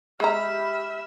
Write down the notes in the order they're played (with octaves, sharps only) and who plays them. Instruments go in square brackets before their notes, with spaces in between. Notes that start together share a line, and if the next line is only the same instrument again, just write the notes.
[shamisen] G#3 A#5 [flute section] G4 B5 F6 [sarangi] E5